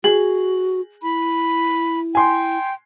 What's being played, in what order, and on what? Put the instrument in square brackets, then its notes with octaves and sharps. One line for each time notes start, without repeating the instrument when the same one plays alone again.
[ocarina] F#4 [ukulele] G#4 [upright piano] F#7
[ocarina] E4 [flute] B5
[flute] G5 [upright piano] G#5 C6